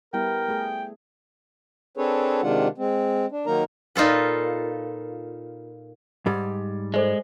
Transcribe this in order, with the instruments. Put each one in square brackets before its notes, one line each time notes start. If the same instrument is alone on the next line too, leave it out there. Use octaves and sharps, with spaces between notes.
[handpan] G3 B3 E4 [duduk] A#4 [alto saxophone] G5
[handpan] A3 G#4
[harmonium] C4 D4 G#4 A4 B4 C#5
C3 D#3 G#3 D4 F4 F#5
G#3 C4
D4
D#3 F#3 A#3 D#4 A#4 A#5
[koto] A#2 D#4 F4 A4 B4
[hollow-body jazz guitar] G#2 G3
[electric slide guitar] G#3 [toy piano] A4 C5 D5